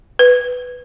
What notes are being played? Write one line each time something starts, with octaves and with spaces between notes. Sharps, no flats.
B4